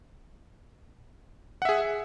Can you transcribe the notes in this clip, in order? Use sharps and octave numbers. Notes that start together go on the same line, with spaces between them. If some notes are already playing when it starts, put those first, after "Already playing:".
G#4 E5 F#5